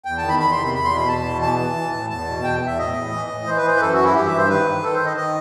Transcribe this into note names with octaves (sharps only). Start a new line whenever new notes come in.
E2 G5
D#3 A5
B5
E2 B5
C6
C3
B5
E2 B5
C6
B2
B5
E2 A5
B2
E3 A5
E3
E3
A2
E2 A5
B2
E2 G5
E2 E5
A2 D#5
A2
E3
A2
E3 C5
B4
E3 C5
B4
F#2 A4
E3 F#4
E4
G2 G4
E5
G2
C5
D#3 B4
D#3
D#3 A4
C5
D#3
D#5
D#3 D#5